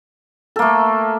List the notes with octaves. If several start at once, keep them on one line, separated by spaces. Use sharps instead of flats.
A3 A#3 A4